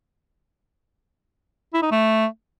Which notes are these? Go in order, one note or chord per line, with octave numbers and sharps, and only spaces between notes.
E4
D#4
A3